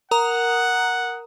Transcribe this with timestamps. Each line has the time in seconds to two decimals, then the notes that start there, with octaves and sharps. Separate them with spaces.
0.11 A#4 F#5 A#5 D#6